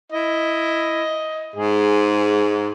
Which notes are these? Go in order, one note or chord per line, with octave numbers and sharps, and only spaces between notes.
E4 D#5
G#2 G#4